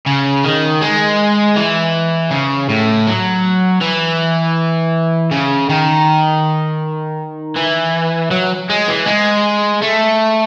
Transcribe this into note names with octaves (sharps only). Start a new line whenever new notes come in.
C#3
D#3
G#3
E3
C#3
A2
F#3
E3
C#3
D#3
E3
F#3
G#3
E3
G#3
A3